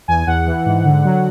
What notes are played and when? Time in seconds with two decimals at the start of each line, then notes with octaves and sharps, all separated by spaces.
0.08 E2 G#5
0.27 E2 F#5
0.47 E3
0.66 G#2
0.85 D3
1.05 F#3